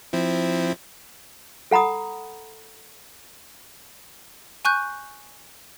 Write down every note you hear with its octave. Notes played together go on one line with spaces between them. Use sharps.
F3 C4 E4
A4 F#5 A#5 B5 D#6
G#5 C#6 F#6 G6